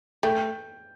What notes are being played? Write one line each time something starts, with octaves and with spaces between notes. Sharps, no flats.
A3 G5